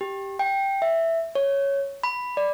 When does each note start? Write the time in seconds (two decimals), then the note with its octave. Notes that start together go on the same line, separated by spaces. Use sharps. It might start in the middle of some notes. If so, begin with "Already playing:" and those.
0.01 G4
0.39 G5
0.82 E5
1.35 C#5
2.04 B5
2.37 D5